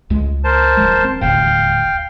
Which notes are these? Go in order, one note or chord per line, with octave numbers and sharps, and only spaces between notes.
C#2 G#3
A#4 C5 A5
D#1 F3 G#3
C4
D#1 A1 D2 F5 G5